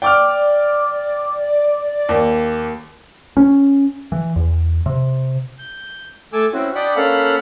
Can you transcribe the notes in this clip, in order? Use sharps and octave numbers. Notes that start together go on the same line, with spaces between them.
D5 G5 D6 F6
D#2
C#4
E3
E2
C3
G6
A3 A4 G#5 D6 E6
C4 C#4 E4 F#4
D4 D5 D#5 F#5 G5 B5
A#3 C#4 A4 F5 F#5 B5